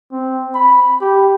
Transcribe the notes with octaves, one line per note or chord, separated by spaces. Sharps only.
C4
B5
G4